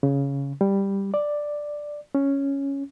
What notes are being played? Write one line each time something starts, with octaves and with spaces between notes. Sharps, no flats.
C#3
G3
D5
C#4